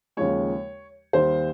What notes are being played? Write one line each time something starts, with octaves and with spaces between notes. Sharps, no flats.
D#2 C#3 F3 G#3 C#5
D#2 D#3 G3 C5